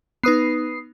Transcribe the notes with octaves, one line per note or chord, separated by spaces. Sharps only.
B3 D#4 B4 D#6 C7